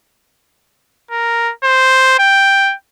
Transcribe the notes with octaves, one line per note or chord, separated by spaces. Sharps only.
A#4
C5
G5